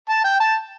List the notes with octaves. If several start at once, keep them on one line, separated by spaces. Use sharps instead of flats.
A5
G5
A5